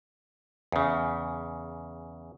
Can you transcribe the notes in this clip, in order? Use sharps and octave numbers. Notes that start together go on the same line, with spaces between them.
E2 C#3